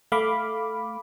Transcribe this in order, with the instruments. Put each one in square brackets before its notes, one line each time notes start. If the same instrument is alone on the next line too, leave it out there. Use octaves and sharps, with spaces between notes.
[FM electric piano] A3 F5 B5 D6